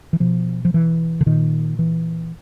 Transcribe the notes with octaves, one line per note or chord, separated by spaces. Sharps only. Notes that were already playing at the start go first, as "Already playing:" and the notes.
E3
B2 F3
F3
E3
D3
A#2 D#3
E3